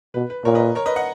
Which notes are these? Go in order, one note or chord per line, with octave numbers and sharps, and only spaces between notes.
B2 B4
B4
A#2 A#4 C#5
B4 D#5
A#4 C#5
B4 D#5
D#5 F#5